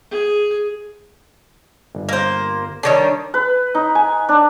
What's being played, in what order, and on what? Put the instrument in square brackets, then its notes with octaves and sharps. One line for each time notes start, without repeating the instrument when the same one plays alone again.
[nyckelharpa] G#4
[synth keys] G1
[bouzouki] A#3 C5
[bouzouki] D3 D#3 G3 [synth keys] D4 C#5
[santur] B4
D#4
G#5
D4